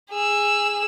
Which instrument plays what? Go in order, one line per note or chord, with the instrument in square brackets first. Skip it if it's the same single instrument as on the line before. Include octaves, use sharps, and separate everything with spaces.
[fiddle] G#4 E6